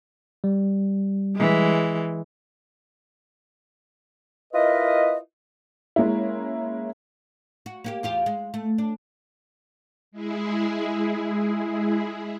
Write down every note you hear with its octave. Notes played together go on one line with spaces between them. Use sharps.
G3
E3 G#3
E4 F4 A#4 B4 D#5
G#3 A#3 C#4 E4
F#4
A#3 F#4 G4
E2 F4 G4
G#3
A3
D4
G#3 E4 G#4